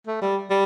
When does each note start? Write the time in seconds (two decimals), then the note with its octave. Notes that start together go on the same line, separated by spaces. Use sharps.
0.07 A3
0.22 G3
0.50 G3